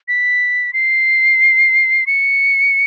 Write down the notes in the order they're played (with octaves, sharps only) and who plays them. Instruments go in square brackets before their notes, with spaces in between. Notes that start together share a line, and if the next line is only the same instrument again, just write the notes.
[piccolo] B6
C7
C#7